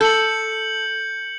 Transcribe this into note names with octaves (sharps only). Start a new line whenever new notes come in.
A4 G6 C#7 F#7